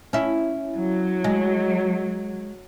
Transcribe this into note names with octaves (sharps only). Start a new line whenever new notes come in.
C#4 E4
F#3
G#3